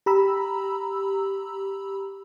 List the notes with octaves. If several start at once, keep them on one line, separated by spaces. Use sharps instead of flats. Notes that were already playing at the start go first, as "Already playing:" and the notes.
G4 A#5 B5 E6